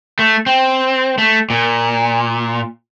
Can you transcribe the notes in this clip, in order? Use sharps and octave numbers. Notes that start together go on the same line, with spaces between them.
A3
C4
A3
A#2